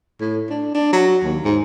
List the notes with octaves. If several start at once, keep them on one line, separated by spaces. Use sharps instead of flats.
A2
D4
D4
F#3
D#2
G#2